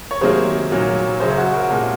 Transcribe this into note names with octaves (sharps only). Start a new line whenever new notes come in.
C#5
C3 D#3 F#3 A#3 G#4 C5
A#2 F#3 A#3 C#4
F#2 C#3 F#3 C#4 G#4 C5
F#4
F#4 A#4
C2 A#2 G#3